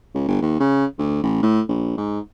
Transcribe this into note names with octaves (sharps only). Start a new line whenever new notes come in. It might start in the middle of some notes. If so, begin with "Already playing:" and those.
C#2
G1
D#2
C#3
D2
A1
A2
A#1
G#2